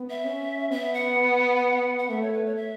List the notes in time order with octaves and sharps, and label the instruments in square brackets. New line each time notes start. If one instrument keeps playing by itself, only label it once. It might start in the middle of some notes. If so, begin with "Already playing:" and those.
Already playing: [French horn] B3
[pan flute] E5
[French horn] C#4
[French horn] B3 [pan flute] E5
[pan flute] F#5
F#5
[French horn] A3 [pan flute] E5
[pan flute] C#5
B4
C#5
E5